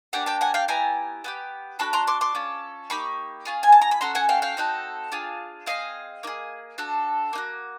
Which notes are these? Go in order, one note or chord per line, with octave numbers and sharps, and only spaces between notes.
A#3 D4 G4 F#5 G#5
G5 A5
F#5 G#5
F5 G5
B3 E4 G4 G#5 A#5
B3 E4 G4
D4 F#4 A4 A5 B5
A#5 C6
C6 D6
C6 D6
C#4 F4 A4
A#3 D#4 G4 B5 C#6
C#4 F4 G#4
G#5
A5
A#5
B5
C#4 F#4 A4 A#5 C6
F#5 G#5
F5 G5
F5 G5
C4 D#4 F#4 A4
D4 F4 G#4
C4 E4 G#4 D#5 F5
A#3 D#4 G#4
D4 F#4 A4
A#3 D#4 F#4